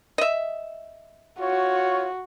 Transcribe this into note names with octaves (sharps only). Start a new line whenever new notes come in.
D#5 E5
F4 F#4 C#5